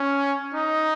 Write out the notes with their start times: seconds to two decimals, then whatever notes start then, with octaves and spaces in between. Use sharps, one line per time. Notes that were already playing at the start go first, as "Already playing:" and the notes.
Already playing: C#4
0.55 D#4